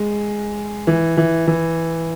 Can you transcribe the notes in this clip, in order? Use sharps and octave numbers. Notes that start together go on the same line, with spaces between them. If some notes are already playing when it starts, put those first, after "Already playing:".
Already playing: G#3
E3
E3
E3